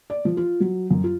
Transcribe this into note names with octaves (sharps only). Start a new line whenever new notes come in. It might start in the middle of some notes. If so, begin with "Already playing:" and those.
D5
F3
F4
F#3
F#2
F4